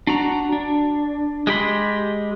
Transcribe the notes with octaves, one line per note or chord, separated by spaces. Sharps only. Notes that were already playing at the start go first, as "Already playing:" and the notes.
D4 F#4 A#5
D4
G#3 G4 B5 C6